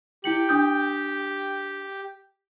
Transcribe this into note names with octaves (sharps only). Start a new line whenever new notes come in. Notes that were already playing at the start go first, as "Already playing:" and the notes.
E4 G4 C#7 F#7
D4 D#6 G6